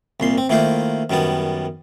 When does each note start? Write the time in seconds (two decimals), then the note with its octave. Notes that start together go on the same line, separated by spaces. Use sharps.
0.20 C2 A#2 C6
0.38 C4
0.49 D#3 A3 A#3 E4 F4 C5
1.10 F#2 D#3 G3 B3 A5